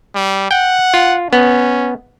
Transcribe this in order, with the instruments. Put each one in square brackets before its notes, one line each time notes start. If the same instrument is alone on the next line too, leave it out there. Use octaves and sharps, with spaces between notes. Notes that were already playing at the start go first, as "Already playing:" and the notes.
[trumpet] G3
[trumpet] F#5 [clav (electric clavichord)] G5
[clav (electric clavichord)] F4
[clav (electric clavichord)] B3 [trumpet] C#4